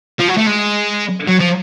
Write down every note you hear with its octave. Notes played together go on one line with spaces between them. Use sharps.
F3
F#3
A3
G#3
F#3
F3